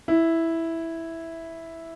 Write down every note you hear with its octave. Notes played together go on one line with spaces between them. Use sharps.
E4